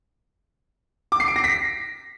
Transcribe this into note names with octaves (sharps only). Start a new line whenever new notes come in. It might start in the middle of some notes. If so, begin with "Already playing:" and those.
D6
C7
D7
A#6
B6